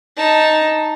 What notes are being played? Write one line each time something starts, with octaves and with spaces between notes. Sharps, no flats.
D#4 A5